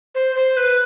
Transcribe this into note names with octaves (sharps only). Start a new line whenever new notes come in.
C5
C5
B4